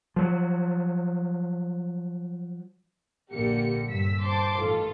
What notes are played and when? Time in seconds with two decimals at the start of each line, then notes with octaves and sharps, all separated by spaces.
0.16 F3 F#3
3.32 A#1 D3 A#3 G4 A#4 C#7
3.88 G2 E6 B6
4.23 C5 A5 C6 D6
4.59 A1 D#3 F4 A4